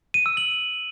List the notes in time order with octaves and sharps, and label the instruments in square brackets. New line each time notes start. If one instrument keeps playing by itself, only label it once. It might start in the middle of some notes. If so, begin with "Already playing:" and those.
[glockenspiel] D#7
E6
F#7